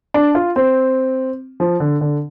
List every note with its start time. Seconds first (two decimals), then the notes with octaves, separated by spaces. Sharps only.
0.14 D4
0.35 F4
0.56 C4
1.60 F3
1.80 D3
2.01 D3